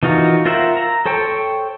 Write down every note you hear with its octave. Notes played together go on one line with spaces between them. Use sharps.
E3 D#4 F4 F#4 A#4
F4 A#4 C5 E5 F#5
A#5
A4 C5 C#5 G5